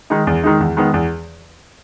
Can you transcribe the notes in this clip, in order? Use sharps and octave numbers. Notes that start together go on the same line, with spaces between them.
D#3 G#3 D#4
E2
D#3 G#3 D#4
E2
D#3 G#3 B3
E2